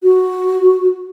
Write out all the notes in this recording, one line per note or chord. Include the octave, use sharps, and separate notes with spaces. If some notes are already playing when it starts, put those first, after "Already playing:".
F#4